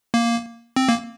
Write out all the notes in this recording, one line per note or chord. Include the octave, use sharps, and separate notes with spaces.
A#3
C4
A#3